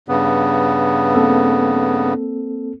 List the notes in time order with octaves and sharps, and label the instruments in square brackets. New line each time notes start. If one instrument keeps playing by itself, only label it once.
[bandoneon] G2 C#3 B3
[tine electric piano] A#3 C4 A4